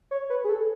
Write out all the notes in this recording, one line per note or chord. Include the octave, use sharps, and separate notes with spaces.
C#5
B4
G#4
A4